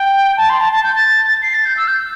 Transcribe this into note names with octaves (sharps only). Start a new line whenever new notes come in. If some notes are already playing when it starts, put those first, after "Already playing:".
Already playing: G5
A5
C6
A5
A5
G6
A6
C7
A6
G6
E6
G6